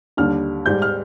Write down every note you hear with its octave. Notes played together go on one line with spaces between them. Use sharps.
D#2 D3 G3 F6
G#2 G3 G6
F6